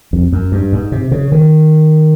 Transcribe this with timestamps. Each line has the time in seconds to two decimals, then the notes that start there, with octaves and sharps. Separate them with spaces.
0.13 F2
0.32 F#2
0.52 G2
0.72 G#2
0.92 C3
1.11 C#3
1.32 D#3